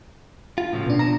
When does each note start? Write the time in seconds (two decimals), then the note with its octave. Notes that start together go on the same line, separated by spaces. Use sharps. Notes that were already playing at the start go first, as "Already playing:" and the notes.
0.58 F4
0.73 A2 C#3 F3
0.86 B2 D4
0.99 A5 A#5